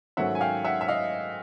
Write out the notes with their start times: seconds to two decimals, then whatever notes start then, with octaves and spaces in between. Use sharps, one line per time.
0.17 G#2 D#3 F#3 A3 C#4 E5 F#5
0.35 G#5
0.41 F5 G5
0.64 E5 F#5
0.81 E5
0.88 D#5 F5